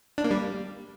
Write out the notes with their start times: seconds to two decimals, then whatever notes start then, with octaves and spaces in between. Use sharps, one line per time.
0.18 D4
0.24 A#3
0.31 G3